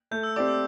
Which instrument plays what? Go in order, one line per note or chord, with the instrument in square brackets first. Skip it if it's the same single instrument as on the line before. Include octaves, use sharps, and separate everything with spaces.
[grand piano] A3 [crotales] G6
[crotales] E6
[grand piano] C4 G4 D5 [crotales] D6
[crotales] E6